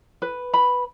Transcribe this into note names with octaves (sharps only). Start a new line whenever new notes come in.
B4
B5